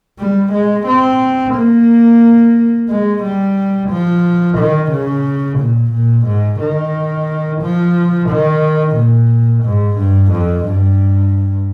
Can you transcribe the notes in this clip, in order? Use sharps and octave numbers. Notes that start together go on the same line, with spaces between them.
G3
G#3
C4
A#3
G#3
G3
F3
D#3
C#3
A#2
A#2
G#2
D#3
F3
D#3
A#2
G#2
G2
F2
G2